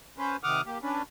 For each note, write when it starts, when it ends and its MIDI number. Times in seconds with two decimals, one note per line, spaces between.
0.18 0.36 61
0.18 0.36 71
0.18 0.36 72
0.44 0.61 48
0.44 0.61 51
0.44 0.61 78
0.44 0.61 86
0.44 0.61 87
0.44 0.61 89
0.66 0.78 58
0.66 0.78 67
0.82 1.02 61
0.82 1.02 62
0.82 1.02 71